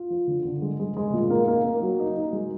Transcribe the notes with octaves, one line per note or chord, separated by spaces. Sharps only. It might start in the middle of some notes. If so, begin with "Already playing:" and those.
Already playing: F4
F3
D3
D3
G#3
G#3
G#3
A#2
A#3
A#3
A#3
F#3
D#4
D#4
G#3